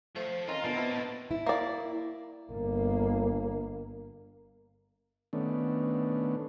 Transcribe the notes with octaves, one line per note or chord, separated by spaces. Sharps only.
F2 A3 C5
D#3 C4 C#4 F4 D#5 F5 A#5 C6
A#2 D3 A#3 B3 F4 A5
C4 E4 B4
B1 A2
E4
A#3 D5
G1 A#3
D#3 A3 B3 C#4 D4